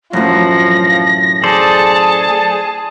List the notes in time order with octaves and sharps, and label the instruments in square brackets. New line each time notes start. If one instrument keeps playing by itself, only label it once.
[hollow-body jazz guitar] F#2 A2 [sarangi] F3 [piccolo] A#6
[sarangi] G#4 [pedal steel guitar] A4 C5 D5 [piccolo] A5